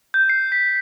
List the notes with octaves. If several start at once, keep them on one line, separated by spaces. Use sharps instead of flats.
G6
C7
B6